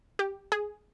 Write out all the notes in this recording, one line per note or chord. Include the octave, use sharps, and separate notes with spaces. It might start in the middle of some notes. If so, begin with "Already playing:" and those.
G4
G#4